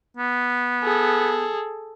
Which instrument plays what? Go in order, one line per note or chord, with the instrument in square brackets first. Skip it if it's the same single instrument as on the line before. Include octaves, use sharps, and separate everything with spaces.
[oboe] B3
[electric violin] G#4 A4